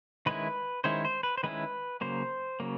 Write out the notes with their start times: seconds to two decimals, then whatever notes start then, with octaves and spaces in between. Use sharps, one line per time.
0.26 D#3 G#3 C#4 E4 B4
0.84 D#3 G#3 C#4 E4 C5
1.05 C5
1.23 B4
1.37 C5
1.43 D#3 G#3 C#4 E4 B4
2.01 C#3 F#3 A#3 C5
2.60 C#3 F#3 A#3